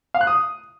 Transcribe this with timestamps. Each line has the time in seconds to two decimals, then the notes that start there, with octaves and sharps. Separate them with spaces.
0.14 F5
0.21 F#6
0.27 D#6